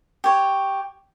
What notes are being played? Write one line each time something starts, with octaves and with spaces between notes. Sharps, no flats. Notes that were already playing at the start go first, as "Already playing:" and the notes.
G4 C#5